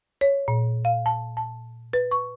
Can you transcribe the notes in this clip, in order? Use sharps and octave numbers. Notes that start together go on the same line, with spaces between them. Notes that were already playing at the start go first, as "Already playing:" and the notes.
C#5
A#2
F5
A5
A5
B4
C#6